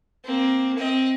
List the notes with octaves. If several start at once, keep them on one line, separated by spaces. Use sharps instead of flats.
A#3 C4
C4 D#5